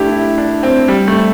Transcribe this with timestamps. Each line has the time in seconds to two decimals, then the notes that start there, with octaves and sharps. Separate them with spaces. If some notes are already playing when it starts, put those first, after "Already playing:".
Already playing: A3 D4 E4 G4
0.12 E4
0.38 D4
0.63 C4
0.88 G3
1.08 A3